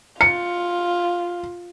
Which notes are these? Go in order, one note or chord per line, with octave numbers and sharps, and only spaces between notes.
F4 C#7